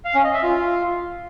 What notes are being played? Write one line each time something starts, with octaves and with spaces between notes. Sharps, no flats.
F5
C#4
D#5
E5
F4